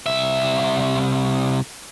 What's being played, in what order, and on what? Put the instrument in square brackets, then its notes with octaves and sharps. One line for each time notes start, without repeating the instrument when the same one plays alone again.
[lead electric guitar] C2 E5